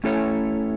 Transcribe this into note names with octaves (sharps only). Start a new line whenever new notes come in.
A3 C#4 E4 A4 C#5